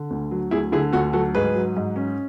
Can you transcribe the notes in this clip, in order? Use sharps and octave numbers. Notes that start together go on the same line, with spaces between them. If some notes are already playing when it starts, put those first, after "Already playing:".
Already playing: D3
D2
F#3
D2 E4 G#4
D3 E4 G#4
D2 F#4 A4
F#3 F#4 A4
G#2 G#4 B4
F#3
G#2
C#4